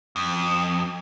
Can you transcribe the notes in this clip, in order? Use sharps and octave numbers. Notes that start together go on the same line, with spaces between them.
F2